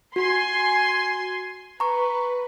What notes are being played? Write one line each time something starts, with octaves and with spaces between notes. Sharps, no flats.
F#4 G#5 C6
B4 A#5 C#6